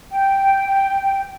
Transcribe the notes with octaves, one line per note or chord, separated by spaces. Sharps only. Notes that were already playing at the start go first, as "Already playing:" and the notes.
G5